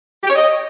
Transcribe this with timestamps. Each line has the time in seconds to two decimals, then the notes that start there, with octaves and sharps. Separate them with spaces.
0.23 G4
0.29 C#5
0.34 D#5